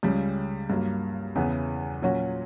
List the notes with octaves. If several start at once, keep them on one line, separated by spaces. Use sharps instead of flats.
C#2 C#3 G3
G2 F#3 A#3
E2 C#3 E3 B3
A#2 F#3 C#4 F#4